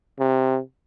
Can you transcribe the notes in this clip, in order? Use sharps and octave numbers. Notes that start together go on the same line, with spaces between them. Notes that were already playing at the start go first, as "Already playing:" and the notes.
C3